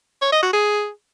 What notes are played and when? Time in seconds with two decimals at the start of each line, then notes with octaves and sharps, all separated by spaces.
0.22 C#5
0.32 D#5
0.43 F#4
0.53 G#4